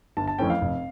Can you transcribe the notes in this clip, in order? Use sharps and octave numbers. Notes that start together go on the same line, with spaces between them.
G1 A5
A5
F2 E3 A3 C#4 G5
F5
F1